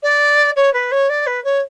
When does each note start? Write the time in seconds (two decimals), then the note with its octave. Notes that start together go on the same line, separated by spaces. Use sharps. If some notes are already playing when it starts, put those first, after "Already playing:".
0.03 D5
0.56 C#5
0.74 B4
0.92 C#5
1.09 D5
1.27 B4
1.44 C#5